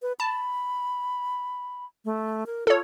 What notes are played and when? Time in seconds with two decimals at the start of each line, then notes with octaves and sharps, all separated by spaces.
0.02 B4
0.20 A5 B5
2.05 A3
2.46 A#4
2.67 F4 A4 C#5